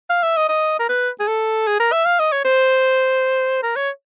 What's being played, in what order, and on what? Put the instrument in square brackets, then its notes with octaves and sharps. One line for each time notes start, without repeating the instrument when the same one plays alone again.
[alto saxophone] F5
E5
D#5
D#5
A#4
B4
G#4
A4
G#4
A#4
E5
F5
D#5
C#5
C5
A#4
C#5